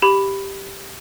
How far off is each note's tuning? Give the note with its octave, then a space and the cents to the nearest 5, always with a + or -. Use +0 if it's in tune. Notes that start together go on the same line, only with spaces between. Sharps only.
G4 +0 B5 +5